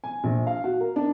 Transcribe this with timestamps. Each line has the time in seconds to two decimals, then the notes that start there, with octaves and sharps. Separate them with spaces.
0.04 G#5
0.24 A#1
0.47 F5
0.64 F#4
0.80 A#4
0.96 D4